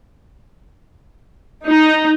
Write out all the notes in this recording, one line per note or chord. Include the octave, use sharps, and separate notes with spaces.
D#4